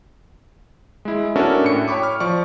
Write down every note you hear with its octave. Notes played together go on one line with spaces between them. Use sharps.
G#3 E4
C#4 D4 E4 F#4 A4 A#4
A2 C#7
C#5 G5 B5 C#6 D6
F6
F3 D5 C#6